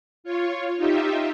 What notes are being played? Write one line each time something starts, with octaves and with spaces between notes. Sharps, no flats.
F4 C#5
D#4 F4 G4 E5